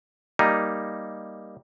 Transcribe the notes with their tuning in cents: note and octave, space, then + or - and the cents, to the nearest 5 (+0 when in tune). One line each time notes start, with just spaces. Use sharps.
G3 +0 A#3 +0 D#4 +0